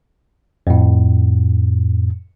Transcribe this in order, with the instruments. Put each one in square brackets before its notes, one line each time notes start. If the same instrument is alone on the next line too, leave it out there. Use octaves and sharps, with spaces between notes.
[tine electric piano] F2 A2